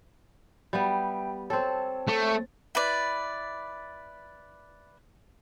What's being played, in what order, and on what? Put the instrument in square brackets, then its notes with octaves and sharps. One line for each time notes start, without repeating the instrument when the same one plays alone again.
[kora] G3 B3 [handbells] E5 G5
[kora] C4 A4 [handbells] C#5 G5 A5
[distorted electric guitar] A3
[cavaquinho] E4 B4 D5